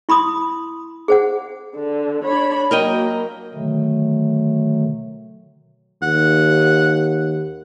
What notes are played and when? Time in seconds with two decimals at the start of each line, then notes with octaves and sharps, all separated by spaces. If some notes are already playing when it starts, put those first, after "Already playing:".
0.09 E4 B5 C6 D#6
1.08 G#4 C5 F#5
1.75 D3
2.23 D4 C#5 B5
2.71 F#3 A#3 A#4 D#5 G5
3.54 B2 D3 D#3 F#3 A3
6.02 D#2 F#5